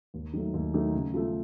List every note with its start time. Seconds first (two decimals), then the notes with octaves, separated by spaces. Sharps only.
0.14 D#2
0.33 D#3 F#3 A3
0.54 D#2
0.74 D#3 F#3 A3
0.94 C#3
1.14 F3 A3